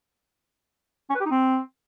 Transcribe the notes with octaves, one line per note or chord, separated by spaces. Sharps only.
C#4
B4
G4
D#4
C4